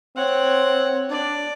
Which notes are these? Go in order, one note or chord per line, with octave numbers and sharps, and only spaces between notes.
C4 C#5 F#5
D4 D5